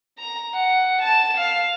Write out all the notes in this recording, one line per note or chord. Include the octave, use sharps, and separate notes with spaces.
A#5
F#5
A5 E7
F5